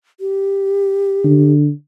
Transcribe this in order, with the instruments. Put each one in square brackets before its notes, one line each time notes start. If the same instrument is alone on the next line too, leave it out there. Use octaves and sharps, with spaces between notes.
[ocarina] G4
[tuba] D3